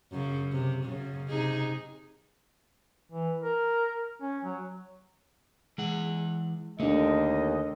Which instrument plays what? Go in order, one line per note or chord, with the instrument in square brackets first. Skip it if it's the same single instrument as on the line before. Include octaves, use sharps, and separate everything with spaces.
[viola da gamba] F#2 C#3
C3
F#2 C#3
C3 D#4 G#4
[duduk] E3
A#4
C#4
F#3
[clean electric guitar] E3 F#5 [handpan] G#3
[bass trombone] D#2 [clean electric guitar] D3 [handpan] A3 D4 [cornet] D#5